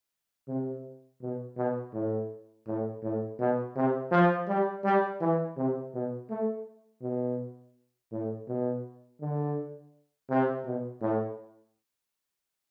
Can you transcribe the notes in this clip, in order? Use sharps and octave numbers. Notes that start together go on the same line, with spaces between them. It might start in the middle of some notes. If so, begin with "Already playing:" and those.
C3
B2
B2
A2
A2
A2
B2
C3
F3
G3
G3
E3
C3
B2
A3
B2
A2
B2
D3
C3
B2
A2